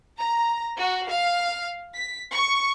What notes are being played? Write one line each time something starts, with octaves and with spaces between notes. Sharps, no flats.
A#5
F#4
F5
B6
C#6